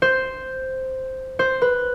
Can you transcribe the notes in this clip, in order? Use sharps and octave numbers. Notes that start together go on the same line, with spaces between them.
C5
C5
B4